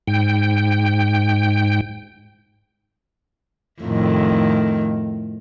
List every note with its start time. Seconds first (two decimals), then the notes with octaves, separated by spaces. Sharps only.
0.07 G#2 G5
3.82 F2 A2 D#3